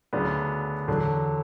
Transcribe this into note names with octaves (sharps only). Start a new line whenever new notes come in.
D2 C#3 F#3 B3 D4
E2 D3 F#3